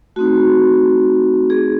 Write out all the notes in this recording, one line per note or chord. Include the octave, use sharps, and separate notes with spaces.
A3 C4 D#4 F#4
G#4